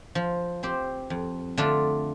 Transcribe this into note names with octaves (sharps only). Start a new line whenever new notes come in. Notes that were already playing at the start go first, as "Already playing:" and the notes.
F3
C4 G4 C5
F2
D3 A3 D4 F4